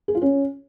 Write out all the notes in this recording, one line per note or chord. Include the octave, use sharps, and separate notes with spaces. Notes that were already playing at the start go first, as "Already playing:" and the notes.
G#4
F4
C#4